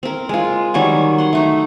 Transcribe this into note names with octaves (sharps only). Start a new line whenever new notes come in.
C4 A#4
G#3 F4
D#3 F#3 G3 G#5
F#5 C6
A3 D#4